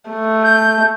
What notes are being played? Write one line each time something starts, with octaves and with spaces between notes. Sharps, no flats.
A3
G6